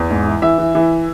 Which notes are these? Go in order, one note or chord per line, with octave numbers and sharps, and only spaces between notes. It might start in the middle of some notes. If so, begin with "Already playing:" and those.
Already playing: E2
G#2
E3
E3 E5
E3
E3